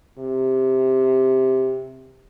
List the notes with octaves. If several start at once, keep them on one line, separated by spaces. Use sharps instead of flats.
C3